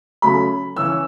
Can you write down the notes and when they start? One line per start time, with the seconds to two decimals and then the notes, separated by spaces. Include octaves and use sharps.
0.22 C#3 F#3 A3 C#4 B5
0.76 C#3 E3 C#4 E6